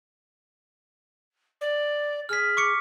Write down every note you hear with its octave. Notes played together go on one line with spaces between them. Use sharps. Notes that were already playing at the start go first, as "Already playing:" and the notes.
D5
G#4 F6 B6
C#6 D6 C#7